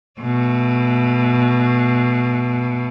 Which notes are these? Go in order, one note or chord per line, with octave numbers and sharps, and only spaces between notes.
B2 A3